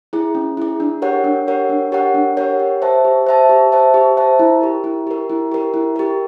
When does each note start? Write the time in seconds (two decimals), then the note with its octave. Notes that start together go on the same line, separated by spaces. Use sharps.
0.13 E4 G#4
0.35 C#4
0.57 E4 G#4
0.80 D4
1.02 G4 A#4 C#5 F#5
1.24 D4
1.47 G4 A#4 C#5 F#5
1.69 D4
1.92 G4 A#4 C#5 F#5
2.14 D4
2.37 G4 A#4 C#5 F#5
2.59 G4
2.82 C5 E5 A5
3.05 G4
3.27 C5 E5 A5
3.49 G4
3.72 C5 E5 A5
3.94 G4
4.17 C5 E5 A5
4.39 E4
4.61 G4 A#4
4.84 E4
5.07 G4 A#4
5.30 E4
5.52 G4 A#4
5.74 E4
5.96 G4 A#4